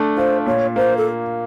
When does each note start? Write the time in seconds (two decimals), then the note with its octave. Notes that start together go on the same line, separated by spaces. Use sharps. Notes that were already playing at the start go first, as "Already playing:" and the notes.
Already playing: A3 D4
0.17 F4 C5
0.46 A#2 C#5
0.76 A#3 C5
0.97 A4